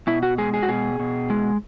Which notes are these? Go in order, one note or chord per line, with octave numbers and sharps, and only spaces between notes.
B2 E4
F#4
G#3 G#4
G#4
F#4
B2 G#4
B2
G#3